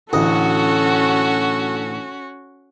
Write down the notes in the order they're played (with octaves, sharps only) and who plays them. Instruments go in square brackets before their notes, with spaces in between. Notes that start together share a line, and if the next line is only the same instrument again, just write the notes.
[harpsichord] A1 D2 D#5 [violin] C#4 F#4 [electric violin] A4 F#5